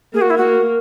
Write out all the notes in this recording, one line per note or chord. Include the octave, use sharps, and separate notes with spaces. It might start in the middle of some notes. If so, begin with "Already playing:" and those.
A#3 G#4
F#4
E4
A#3 F#4